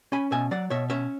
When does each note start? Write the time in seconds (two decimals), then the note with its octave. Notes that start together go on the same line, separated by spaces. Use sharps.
0.12 C#4 G#5 B5
0.32 B2 E5 G#5
0.51 F#3 D5 F#5
0.70 B2 C#5 E5
0.90 C#4 C#5 E5